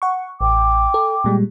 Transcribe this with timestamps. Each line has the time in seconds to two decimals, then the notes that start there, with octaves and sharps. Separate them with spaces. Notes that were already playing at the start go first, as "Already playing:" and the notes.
0.02 F#5 C#6
0.41 A1 G5 D6
0.94 A4
1.24 A#2 G3 G#3